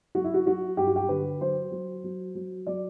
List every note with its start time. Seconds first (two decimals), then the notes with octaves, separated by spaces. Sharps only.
0.15 F#3 F#4
0.24 E4
0.34 F#4
0.46 F#3 F#4
0.77 G2 G4
0.87 F#4
0.96 G4
1.09 D3 B4
1.41 F#3 C5
1.72 F#3
2.04 F#3
2.35 F#3
2.67 F#3 D5